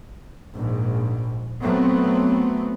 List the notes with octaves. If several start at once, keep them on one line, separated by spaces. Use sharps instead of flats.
A#1 G#2
F#3 A3 B3 C4